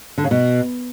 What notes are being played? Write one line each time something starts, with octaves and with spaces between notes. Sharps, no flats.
D3
C#3
B2